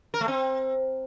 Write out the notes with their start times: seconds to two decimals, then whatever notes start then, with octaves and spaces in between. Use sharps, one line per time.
0.14 A#4
0.21 A3
0.28 C4